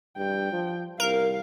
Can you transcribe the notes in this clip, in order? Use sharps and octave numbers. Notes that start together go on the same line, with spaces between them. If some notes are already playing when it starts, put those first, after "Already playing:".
G2 G5
F3
C2 A#4 F5